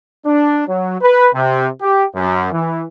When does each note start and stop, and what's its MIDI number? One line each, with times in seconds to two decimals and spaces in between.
0.25 0.65 62
0.67 0.95 54
1.01 1.28 71
1.34 1.66 48
1.82 2.03 67
2.15 2.51 42
2.51 2.84 52